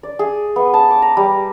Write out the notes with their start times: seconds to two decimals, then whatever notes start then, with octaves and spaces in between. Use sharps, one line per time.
0.03 D5
0.19 G#4
0.56 B3
0.73 A5
0.90 D6
1.02 A#5
1.17 G3